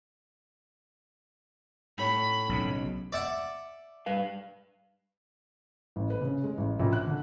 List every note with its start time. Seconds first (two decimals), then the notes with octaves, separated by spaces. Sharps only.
1.98 A2 C#5 B5
2.49 B1 C#3
3.13 D5 E5 F#5
4.06 G2 B4 F5
5.96 A1
6.10 B4
6.21 C#3
6.44 G#3
6.58 A1
6.80 A#1
6.93 F#6
7.07 D3